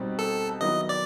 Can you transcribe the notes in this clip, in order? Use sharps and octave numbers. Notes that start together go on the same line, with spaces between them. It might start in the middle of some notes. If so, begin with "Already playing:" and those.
Already playing: B2 G3 C4 D#4 G4
A4
D#3 F#3 B3 E4 D#5
D5